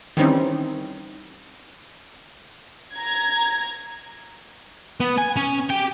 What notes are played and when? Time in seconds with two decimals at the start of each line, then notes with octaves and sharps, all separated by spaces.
0.17 D#3 E3 G3 C4 C#4 D#4
2.96 A#5 G#6
5.00 B3
5.18 G#5
5.36 C#4
5.70 G4 G5